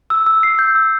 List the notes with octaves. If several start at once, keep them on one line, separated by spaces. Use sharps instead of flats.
E6
E6
C7
G6
E6